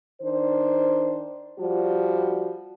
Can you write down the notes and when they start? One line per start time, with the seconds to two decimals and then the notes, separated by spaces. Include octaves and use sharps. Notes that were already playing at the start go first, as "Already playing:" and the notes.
0.22 D#3 D4 C5
1.59 F3 G3 F#4